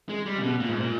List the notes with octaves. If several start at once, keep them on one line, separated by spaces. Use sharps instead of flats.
G#3
G3
C#3
B2
A#2
G#2
A#2